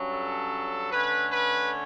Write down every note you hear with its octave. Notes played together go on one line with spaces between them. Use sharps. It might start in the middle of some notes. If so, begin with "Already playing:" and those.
Already playing: G2 F#3 C#4
A4
D3 A3 C#4 B4
B4